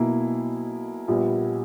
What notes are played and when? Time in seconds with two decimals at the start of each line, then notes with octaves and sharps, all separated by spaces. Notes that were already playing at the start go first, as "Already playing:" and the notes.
Already playing: B1 B2 A#3 E4
1.08 A#1 A#2 G3 B3